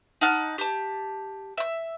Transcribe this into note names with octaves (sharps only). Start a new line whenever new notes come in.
D#4 F#5 A5 F6
G4 A5
E5 E6